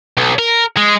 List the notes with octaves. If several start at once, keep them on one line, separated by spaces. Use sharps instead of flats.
B1
A#4
G#3